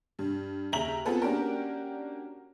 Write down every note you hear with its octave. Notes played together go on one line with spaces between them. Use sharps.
G2
D#2 C#3 G4 E5 A#5 F#7
B3 C4 F4 G#4 A4 B4
A#3 C#4 D4 F#4 G4 A#4